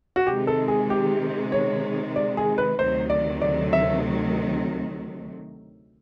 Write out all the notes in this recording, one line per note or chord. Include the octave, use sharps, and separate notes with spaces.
F#4
C3 D#3 G#3 G4
A4
G#4
G4
C#5
D5
G#4
B4
D2 C3 D#3 F#3 A3 C5
D5
D5
E5